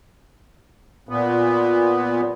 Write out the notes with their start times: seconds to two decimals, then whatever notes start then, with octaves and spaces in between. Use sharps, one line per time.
1.09 A#2 B3